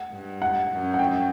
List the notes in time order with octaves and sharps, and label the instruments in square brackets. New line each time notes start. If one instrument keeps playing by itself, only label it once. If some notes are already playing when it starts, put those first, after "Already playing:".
Already playing: [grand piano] F#5
[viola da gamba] G2
[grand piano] F#5
[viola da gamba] F#2
[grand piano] F#5
G5